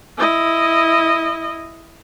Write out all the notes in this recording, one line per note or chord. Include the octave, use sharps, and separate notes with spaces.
E4 D#5